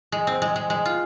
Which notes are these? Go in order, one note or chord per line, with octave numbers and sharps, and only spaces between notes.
G#3
C4
G#3
G#3
G#3
F4